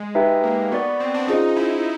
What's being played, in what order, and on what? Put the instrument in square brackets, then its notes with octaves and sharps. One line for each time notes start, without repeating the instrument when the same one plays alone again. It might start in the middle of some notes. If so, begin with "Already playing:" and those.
Already playing: [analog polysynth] G#3
[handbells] D#4 G4 B4 E5 G5
[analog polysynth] A#3
[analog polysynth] B3 [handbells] F#4 A#4 D5
[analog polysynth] C4
D4
[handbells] C#4 F4 G#4 C5 D#5 [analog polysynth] D#4
[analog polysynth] E4